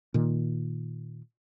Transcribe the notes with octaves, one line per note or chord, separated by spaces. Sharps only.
A#2 D#3